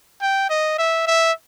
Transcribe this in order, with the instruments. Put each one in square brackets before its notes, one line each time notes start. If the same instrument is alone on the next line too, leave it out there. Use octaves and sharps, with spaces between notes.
[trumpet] G5
D#5
E5
E5